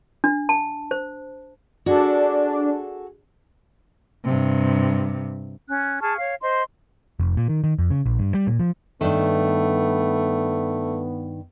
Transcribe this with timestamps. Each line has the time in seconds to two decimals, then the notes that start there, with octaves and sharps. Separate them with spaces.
0.24 D4
0.49 A5
0.91 C5
1.86 D4 F#4 G#4 A4
4.24 G2 C3
5.69 C#4 F#6
6.01 G#4 A5 C#6 F6
6.19 C#5 F5
6.42 C5 D#5 C6
7.20 F1
7.37 A#2
7.49 D#3
7.64 D#3
7.79 F2
7.90 C#3
8.06 A#1
8.19 G2
8.34 G3
8.47 A#2
8.59 F3
9.01 G2 D#3 A3 B3